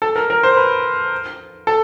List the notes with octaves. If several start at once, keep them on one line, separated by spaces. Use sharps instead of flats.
A4
A#4
A#4
C5
B4
A4